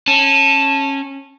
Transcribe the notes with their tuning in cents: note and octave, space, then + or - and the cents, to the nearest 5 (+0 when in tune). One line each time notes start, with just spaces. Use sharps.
C#4 -20 A5 +0